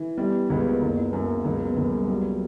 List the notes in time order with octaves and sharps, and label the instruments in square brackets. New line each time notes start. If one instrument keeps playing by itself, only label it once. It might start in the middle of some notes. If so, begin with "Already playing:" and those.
Already playing: [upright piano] E3
[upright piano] G3 [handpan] B3
[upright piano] C#2 [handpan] B3
[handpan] A#3
[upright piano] F#1
[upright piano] F#2 [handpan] A#3
[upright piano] C#2 [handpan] F#3
[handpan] B3
[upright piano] C#2 [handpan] A#3
[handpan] G3
[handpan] F#3 [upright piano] G3
[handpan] F#3